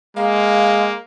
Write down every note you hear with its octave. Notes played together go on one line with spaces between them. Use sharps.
G#3 A#3 F5